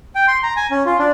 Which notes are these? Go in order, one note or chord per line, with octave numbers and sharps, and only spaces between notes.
G5
C6
A#5
G#5
C#4
F4
D4